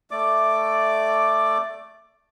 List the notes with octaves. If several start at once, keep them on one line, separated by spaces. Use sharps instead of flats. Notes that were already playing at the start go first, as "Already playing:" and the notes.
A3 D5 D6